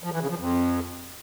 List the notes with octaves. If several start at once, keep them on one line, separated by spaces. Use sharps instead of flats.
F3
E3
C#3
F3
F2